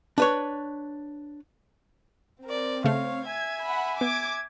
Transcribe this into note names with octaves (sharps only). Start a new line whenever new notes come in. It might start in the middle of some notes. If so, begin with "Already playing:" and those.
D4 B4 C#5
C4 A#4 D5
C#3 A3 C#5 F5
E5 G#5 G#6
F#5 B5
B3 D6 G#6